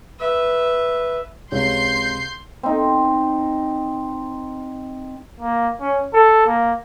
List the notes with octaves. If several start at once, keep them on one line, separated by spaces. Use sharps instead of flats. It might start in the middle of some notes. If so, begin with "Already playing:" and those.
B4 E5
C#2 C3 C#5 C6 G6 C7
C4 D#4
A#3
C#4
A4
A#3